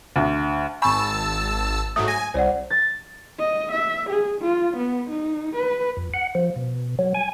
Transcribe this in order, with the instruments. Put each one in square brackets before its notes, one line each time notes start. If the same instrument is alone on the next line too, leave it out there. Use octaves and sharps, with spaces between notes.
[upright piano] D2
[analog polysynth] G#1 A5 E6 [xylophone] G#5 B5 C#6
[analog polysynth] G#2 F#3 A3 [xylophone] D#6
[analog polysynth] G#5 [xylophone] A#6
[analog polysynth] C2 [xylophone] C5 D5 F#5
[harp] A6
[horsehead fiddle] D#5
E5
G#4
F4
B3
D#4
B4
[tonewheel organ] F2
F#5
F3
B2
F#3
G#5